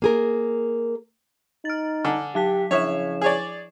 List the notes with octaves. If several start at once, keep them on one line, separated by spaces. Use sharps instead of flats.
A#3 G#4 A#4
D#4 F6 A6
D3 G#5
F#3 G4 A5 B6
C#3 F3 E4 C#5 E5 E7
G#4 C#5 D5